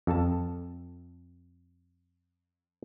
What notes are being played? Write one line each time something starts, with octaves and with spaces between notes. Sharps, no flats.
F2 A4 A5